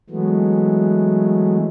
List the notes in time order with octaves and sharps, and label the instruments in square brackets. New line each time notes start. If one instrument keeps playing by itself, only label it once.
[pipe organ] E3 F#3 G#3 A3 B3